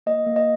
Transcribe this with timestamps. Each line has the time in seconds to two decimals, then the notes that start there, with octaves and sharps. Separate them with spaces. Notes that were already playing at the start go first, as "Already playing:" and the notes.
0.06 A#3 D#5
0.26 A#3
0.36 D#5